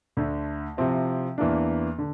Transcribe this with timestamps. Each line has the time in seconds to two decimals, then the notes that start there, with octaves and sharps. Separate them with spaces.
0.17 D2 D3 A3
0.77 C3 F3 C4 E4
1.38 E2 E3 A#3 D4
1.98 D3